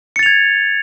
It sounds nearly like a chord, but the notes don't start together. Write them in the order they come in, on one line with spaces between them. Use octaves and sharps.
C#7 A6 F7 G#6